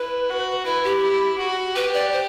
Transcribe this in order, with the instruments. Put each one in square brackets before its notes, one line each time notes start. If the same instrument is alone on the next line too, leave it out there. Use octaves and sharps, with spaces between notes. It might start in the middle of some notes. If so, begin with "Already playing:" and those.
Already playing: [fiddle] E4 [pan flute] B4
[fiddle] F#4
[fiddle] E4 [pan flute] B4
[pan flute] G4
[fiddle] E4
F#4
[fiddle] G4 [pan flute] B4
[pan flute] D5
C5